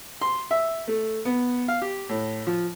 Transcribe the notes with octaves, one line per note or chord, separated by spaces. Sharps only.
C6
E5
A3
B3
F5
G4
A2
F3